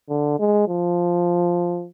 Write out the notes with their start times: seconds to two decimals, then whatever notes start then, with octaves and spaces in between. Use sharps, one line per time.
0.09 D3
0.39 G#3
0.68 F3